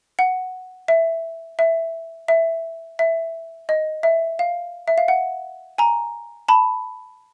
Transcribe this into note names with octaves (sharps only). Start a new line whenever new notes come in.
F#5
E5
E5
E5
E5
D#5
E5
F5
E5
F5
F#5
G#5 A#5
A5 B5